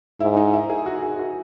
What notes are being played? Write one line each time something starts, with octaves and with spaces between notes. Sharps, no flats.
G#2 E4
D#4
E4
G#4
F#4
G#4
F#4